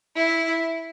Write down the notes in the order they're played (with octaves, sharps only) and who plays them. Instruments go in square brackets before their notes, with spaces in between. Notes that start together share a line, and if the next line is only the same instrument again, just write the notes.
[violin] E4